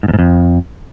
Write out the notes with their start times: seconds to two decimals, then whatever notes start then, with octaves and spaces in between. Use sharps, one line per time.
0.03 G#2
0.08 E2
0.13 G#2
0.19 F2